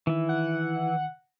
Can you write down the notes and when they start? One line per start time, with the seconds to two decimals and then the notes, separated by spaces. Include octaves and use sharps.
0.07 D#3 E3 E4
0.29 F#5